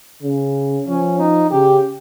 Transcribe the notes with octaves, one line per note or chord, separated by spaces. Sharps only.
C#3
F3 C#4
D#4
C#3 G4